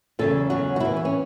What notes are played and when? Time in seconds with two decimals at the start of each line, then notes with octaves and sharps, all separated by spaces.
0.19 E2 C#3 F#3 A4
0.50 E2 C#3 F#3 F#4
0.76 F#4
0.80 E2 E3 E4
0.97 B3
1.05 C#4